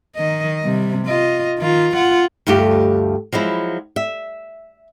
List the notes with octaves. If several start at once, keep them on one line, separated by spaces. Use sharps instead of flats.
D#3 D#5
C3 G3
F4 D#5
D#3 F4
F4 F#5
D2 G2 A3 F4 G4
F3 F#3 G#3 E4
E5